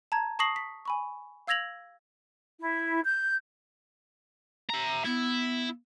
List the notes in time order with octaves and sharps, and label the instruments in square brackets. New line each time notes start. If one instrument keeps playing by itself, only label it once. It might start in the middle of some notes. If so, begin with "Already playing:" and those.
[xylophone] A5 A#5 G#6
A5 C#6 D#6 A#6 C7 F#7
B6
G#5 B5 C#6
F5 E6 G#6 A#6 F7 F#7
[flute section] E4
G6
[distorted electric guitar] E5 A#5
[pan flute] B3 [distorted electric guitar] E4